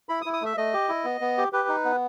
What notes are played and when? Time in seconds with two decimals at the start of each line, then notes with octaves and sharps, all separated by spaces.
0.09 E4 B5
0.21 D#6
0.26 E4
0.33 D#6
0.41 A3 E5
0.57 A3 D#5
0.74 G4
0.89 E4
1.05 B3
1.21 B3
1.38 G4
1.53 G4 B4
1.68 D#4
1.85 B3